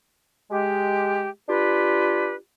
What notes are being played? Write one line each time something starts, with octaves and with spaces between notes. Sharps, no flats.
G#3 G4
D4 F4 G4 B4